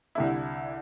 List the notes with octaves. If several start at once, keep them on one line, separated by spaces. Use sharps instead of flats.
C2 D3 E4